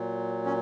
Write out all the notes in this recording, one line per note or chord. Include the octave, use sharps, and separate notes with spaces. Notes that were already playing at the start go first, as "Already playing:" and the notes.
Already playing: A#2 F#3
C#4